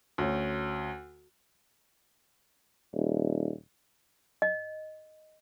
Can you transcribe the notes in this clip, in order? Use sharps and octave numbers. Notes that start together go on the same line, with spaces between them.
D2 C#4
D#1
D#5